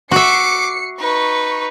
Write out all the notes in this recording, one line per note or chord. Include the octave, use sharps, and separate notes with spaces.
F#4 E5 D6 C7 C#7
D#4 B4 C#6